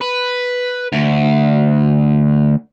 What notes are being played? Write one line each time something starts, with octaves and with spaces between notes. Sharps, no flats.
B4
D2